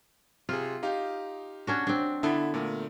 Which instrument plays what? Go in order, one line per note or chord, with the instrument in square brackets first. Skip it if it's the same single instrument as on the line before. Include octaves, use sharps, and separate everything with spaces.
[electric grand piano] C3 G#4 [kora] F4
[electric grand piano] D#4 G4 F5
[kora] C#4 D4 F#4
C4 D4
[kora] D3 B3 A4 [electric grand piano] E4
[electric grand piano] A#2 A3 A#4